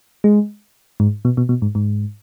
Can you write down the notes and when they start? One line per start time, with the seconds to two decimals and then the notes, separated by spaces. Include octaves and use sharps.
0.24 G#3
1.00 G#2
1.25 B2
1.37 B2
1.49 B2
1.62 G#2
1.75 G#2